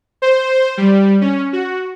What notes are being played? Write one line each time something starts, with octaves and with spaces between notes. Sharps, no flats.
C5
G3
C#4
F#4